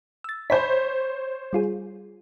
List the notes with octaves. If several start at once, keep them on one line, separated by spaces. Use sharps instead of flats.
E6 A6
C5 C#5 B5 B6
G3 F4 G#4